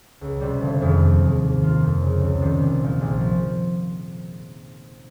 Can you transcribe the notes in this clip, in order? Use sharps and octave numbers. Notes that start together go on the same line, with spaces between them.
C#2
C3 G3
G1
F2 D#3 G#3
D#2
D#3 G#3
G#2
D#3 A#3 F4
F2
C#3 G#3
C#2
C3 D#3 G3
A#1
A#2 F3
A#1
F3